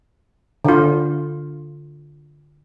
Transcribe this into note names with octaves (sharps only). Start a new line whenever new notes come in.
D3 F4